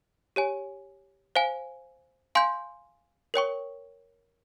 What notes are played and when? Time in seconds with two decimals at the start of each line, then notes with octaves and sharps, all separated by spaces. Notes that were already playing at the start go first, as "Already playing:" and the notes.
0.36 G4 C#5 G#5
1.35 C5 F5 G#5
2.35 F5 G#5 C6 G6
3.34 A#4 C#5 G5 C#6